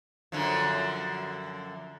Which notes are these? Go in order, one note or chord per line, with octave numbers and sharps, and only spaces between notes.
F#2 D3 F3